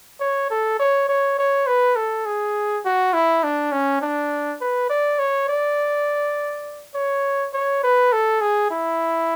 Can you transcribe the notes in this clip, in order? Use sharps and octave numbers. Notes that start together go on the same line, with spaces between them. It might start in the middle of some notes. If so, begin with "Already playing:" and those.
C#5
A4
C#5
C#5
C#5
B4
A4
G#4
F#4
E4
D4
C#4
D4
B4
D5
C#5
D5
C#5
C#5
B4
A4
G#4
E4